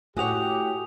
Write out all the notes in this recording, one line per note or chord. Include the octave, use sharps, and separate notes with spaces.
A2 F#4 G4 C#5 F#5 G#5 D#6 F7